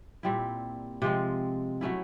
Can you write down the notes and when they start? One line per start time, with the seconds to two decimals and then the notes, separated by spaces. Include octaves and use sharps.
0.23 A#2 G3 C4 E4
1.02 C3 F3 G#3 C4
1.81 F#3 A3 C#4 E4